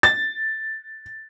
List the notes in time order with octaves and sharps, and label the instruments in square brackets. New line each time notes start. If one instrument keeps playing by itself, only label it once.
[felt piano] A6